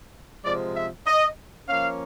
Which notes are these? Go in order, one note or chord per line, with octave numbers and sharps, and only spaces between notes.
C3 F3 G#3 D5
E5
D#5
F3 A#3 C#4 F5